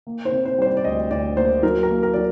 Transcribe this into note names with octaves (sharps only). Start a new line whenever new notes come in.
A#3
C5
C3
C5
G3 C5
D5
D5
D2 D#5
D2 D5
A#3 C5
F#3 A#4
A#4
A#3
A#4
F#3 D5